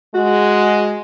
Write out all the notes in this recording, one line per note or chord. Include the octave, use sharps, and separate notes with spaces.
G#3 F#4